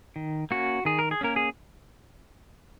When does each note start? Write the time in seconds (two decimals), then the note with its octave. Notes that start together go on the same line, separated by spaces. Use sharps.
0.16 D#3
0.51 A#3 C#4 F#4
0.85 D#3 G#4
0.99 A#4
1.11 G#4
1.21 A#3 C#4 A#4
1.36 G#4